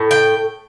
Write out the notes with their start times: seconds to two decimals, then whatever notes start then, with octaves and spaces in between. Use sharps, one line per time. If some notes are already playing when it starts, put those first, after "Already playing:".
Already playing: A2
0.11 G5